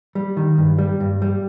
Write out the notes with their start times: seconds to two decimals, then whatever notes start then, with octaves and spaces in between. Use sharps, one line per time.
0.15 G3
0.37 D#3
0.58 G2
0.78 G3
1.00 G2
1.22 G3